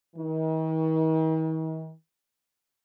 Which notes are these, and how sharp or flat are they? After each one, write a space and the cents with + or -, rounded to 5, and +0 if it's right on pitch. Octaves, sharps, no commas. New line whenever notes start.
D#3 +45